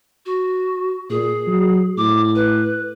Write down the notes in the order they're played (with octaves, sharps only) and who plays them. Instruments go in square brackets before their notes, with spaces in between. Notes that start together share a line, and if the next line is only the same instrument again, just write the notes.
[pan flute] F#4
[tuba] A#2 [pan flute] G#4
[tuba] F#3
[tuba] A2 [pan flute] D6
[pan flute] B4